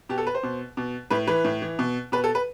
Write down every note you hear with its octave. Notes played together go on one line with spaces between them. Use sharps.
B2 G4
A4
B4
C5
B2
B2
A2 B4
E3 B4
A2
E3
B2
B2 B4
A4
B4